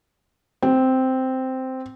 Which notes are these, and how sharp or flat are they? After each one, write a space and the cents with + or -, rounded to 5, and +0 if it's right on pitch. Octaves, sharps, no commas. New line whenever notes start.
C4 -5